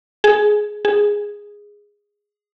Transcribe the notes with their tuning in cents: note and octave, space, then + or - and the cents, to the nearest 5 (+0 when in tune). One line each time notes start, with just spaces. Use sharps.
G#4 +10
G#4 -10